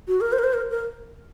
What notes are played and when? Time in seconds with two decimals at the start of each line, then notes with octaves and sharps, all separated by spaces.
0.08 F#4
0.21 A#4
0.33 C5
0.39 A#4
0.44 C5
0.54 A#4
0.71 A#4